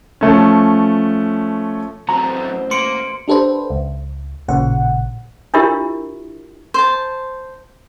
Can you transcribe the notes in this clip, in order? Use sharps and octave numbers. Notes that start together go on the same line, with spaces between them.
F3 A3 C#4
A1 B2 F#3 C4 C5 A#5
A#3 C6 C#7 D7
D4 G4 A4 B4 C5
C#2
A1 A#2 C#3 F#5
D4 E4 F4 G4 A#4 E5
C5 A5